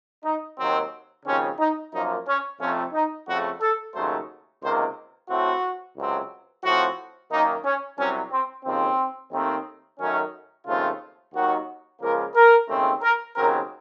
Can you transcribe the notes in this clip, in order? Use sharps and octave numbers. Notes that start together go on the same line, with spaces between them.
D#4
D#2 D#3 F#3 C4
D#2 C#3 F3 C4 C#4
D#4
F#2 F3 A#3 D#4
C#4
F2 C3 F3 A3 C4 C#4
D#4
F2 C#3 A3 F#4
A4
D#2 C#3 F#3 A3 C5
C#2 C3 D#3 A#3 C5
A2 A3 C4 F#4
C#2 C3 F#3 C4
A2 F3 C4 F#4
F#2 D#3 A#3 D#4
C#4
C2 C3 F#3 C#4
C4
D#2 C#3 F3 C4
D#2 D#3 A3 C4
F#2 D#3 F#3 A3 C#4
D#2 C#3 F3 A3 C4 F4
D#2 D#3 F#3 F#4
C#2 C#3 F3 A#3 A#4
A#4
D#2 C#3 A3 C4
A#4
D#2 C#3 F#3 C4 A#4